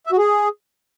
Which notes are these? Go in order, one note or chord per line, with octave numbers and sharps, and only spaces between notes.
E5
F#4
G#4